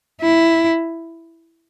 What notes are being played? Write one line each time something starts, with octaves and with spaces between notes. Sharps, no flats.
E4